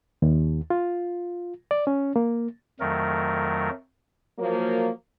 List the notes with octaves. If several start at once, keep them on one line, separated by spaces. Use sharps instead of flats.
D#2
F4
D5
C#4
A#3
F2 D#3 F#3 A3 A#4
F3 F#3 A#3